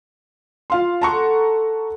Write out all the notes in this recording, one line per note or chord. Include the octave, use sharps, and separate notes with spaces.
F4 F5 C6
A4 F#5 A5 A#5 C6 C#6